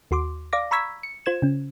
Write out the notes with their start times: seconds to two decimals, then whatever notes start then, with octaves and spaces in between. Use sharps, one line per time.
0.11 D#2 F#4 C6 D6
0.53 D5 F5 D6 A#6
0.71 A#5 B5 C#6 E6 G#6 B6
1.03 C#7
1.26 F4 C5 G#6 E7
1.42 C#3 C#4